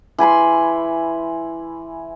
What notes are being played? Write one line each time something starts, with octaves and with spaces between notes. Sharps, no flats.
E3 G#5 B5 C6